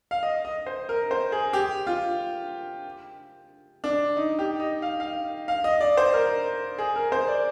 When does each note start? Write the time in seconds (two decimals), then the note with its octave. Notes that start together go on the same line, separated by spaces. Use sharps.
0.11 F5
0.23 D#5
0.45 D#5
0.67 C5
0.89 A#4
1.11 C5
1.32 G#4
1.53 G4
1.87 F4
3.84 D4
4.17 D#4
4.39 G4
4.60 D#5
4.82 F5
5.00 F5
5.48 F5
5.64 D#5
5.81 D5
5.97 C5
6.14 A#4
6.78 G#4
6.96 A#4
7.12 C5
7.28 D5